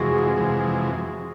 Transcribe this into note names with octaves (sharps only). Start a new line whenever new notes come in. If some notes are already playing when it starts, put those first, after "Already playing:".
Already playing: F2 C3 E3 G#3 F#4 G#4
F2 C3 E3 G#3